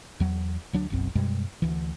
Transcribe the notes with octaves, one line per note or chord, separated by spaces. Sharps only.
E2 F#3
D2 F#3 D4
F#1 B1 F#2 C4
F#2 B2 G3 G#3
D2 E3